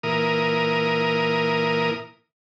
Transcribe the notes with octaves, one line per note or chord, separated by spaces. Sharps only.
A#2 E3 A#4 D#6